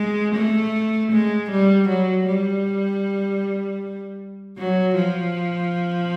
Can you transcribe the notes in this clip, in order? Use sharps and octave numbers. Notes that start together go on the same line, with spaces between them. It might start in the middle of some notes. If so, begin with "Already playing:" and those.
Already playing: G#3
A3
G#3
G3
F#3
G3
F#3
F3